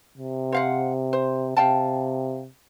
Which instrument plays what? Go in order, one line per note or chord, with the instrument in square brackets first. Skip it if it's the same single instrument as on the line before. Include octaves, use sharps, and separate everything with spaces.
[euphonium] C3
[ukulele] C5 F5 F#5
C5
[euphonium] C3 [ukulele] F5 G5 A5